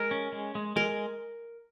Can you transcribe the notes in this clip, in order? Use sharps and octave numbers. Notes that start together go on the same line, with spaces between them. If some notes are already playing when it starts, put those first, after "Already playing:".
Already playing: G#3 A#4
C#4
G#3
G#3
G#3 A#4